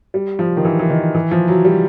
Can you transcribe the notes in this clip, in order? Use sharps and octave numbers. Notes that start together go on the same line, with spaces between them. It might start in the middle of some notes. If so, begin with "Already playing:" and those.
G3
F3
D#3
E3
E3
D#3
E3
F3
F#3
G3